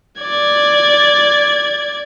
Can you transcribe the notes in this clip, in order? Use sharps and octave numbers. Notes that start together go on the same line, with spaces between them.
D5 G#6